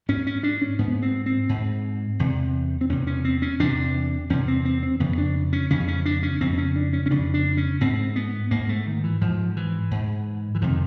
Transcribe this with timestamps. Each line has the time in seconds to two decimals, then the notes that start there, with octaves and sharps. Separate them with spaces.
0.09 G#2 C#4
0.27 C#4
0.43 D4
0.62 C#4
0.79 G#2 B3
0.92 B3
1.02 C4
1.26 C4
1.49 G#2
2.19 E2 C3
2.81 C4
2.89 E2 C3 C#4
3.07 C#4
3.25 C4
3.42 C#4
3.60 E2 C3 D4
4.30 E2 C3 C#4
4.48 C4
4.65 C4
4.83 C4
5.00 F2 C#3 B3
5.18 D4
5.53 C#4
5.70 F2 C#3 C#4
5.88 C#4
6.06 D4
6.23 C#4
6.41 F2 C#3 C4
6.53 C4
6.58 C#4
6.76 D4
6.93 C#4
7.06 C#4
7.10 F2 C#3 D4
7.34 D4
7.57 C#4
7.81 G#2 C4
8.16 B3
8.51 G#2 A#3
8.69 A3
8.87 D#3
9.04 E3
9.21 G#2 F3
9.57 E3
9.91 G#2
10.55 E3
10.62 F2 C3 D#3